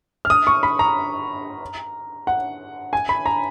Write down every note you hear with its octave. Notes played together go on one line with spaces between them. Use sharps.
F6
D#6
C#6
B5
A#5
F#5
G#5
B5
A#5